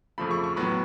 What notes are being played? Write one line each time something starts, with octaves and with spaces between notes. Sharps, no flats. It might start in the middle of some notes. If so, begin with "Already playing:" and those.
F2 C#3 F3 A3 B5
C#6
C#6
A2 F#3 B3 B5